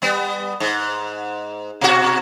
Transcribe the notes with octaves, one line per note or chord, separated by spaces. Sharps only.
G3 B3
G#2
B2 F#4